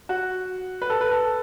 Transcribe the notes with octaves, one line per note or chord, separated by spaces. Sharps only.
F#4
B4
A4
B4
A4